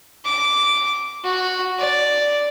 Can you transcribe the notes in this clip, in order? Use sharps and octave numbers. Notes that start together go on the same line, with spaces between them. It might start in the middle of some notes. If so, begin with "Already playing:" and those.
D6
F#4
D5